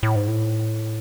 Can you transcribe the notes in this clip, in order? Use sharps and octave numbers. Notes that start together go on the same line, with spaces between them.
A2
G#2
A2